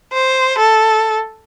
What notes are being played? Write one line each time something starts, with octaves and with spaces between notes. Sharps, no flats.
C5
A4